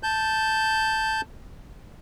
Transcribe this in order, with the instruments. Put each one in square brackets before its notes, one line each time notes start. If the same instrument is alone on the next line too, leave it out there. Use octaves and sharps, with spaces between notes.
[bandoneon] A5 G6